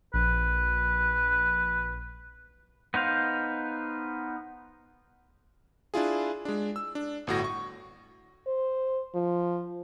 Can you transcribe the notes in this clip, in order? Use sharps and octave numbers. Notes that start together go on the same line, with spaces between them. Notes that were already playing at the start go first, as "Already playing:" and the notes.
A#1 B4
B3 D#4 C5 F5
D4 E4 F4 G#4
G#3 D4
E6
D4
G1 A2 F#4 A#6
C#6
C5
F3